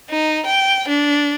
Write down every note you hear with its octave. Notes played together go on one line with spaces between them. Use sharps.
D#4
G5
D4